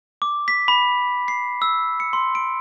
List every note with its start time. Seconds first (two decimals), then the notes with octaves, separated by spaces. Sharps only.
0.22 D6
0.48 B6
0.68 B5
1.28 C7
1.62 E6
2.00 C#7
2.13 C6
2.35 D7